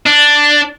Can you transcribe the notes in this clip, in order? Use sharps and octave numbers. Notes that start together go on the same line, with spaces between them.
D4